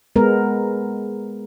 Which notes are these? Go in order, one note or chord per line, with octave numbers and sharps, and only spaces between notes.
G#3 B3 A#4